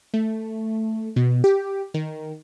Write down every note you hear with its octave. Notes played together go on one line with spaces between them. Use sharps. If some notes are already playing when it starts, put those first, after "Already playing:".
A3
B2
G4
D#3